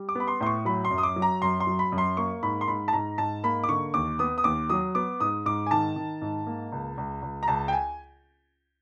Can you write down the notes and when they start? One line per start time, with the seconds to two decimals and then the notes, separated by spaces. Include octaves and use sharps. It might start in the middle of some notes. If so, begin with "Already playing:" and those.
Already playing: G3
0.09 D6
0.15 B3 B5
0.28 C6
0.40 A2 C6
0.46 C#6
0.65 F#3 B5
0.85 C6
0.91 F#2
0.98 D#6
1.03 D6
1.16 F#3
1.22 A#5
1.42 F#2 C6
1.60 C6
1.67 F#3
1.79 B5
1.92 F#2
1.98 C6
2.17 A#3 C#6
2.42 G#2 B5
2.61 C6
2.68 G#2 B5
2.88 A5
2.93 G#2 A#5
3.18 G#2 A5
3.44 A#3 B5
3.64 D6
3.69 D3 C#6
3.94 D#2 D6
4.19 B3 D#6
4.38 D#6
4.44 D#2 D6
4.70 F#3 D#6
4.95 B3 D6
5.20 G#2 D#6
5.45 G#2 D6
5.66 G#5
5.71 D#3 A5
5.96 D#3
6.21 G#2
6.47 A#3
6.72 C#2
6.97 C#2
7.22 C#2
7.43 A#5
7.48 C#2 A5
7.68 G5
7.72 G#5